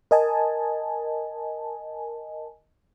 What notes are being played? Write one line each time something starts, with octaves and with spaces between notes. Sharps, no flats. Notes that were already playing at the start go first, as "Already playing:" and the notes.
A#4 D#5 G#5 A5